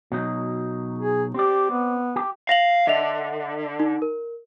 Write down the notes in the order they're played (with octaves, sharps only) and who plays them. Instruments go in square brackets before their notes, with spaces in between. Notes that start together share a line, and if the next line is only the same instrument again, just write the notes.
[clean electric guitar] B2 F#3 D#4
[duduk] G#4
[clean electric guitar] C4 D5 [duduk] G4
[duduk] B3
[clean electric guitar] G4
[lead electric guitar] F5 [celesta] A#6 F7 F#7
[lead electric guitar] D3 [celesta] D#5 E5 F7
[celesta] D#4
A#4